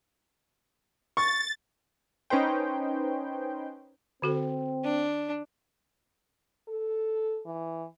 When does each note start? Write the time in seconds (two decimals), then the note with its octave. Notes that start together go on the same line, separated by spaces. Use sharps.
1.17 C#6 A6
2.30 C#4 D#4 B4 C5 G5
4.22 D3 C4 F#4 A4
4.84 D4
6.68 A4
7.46 E3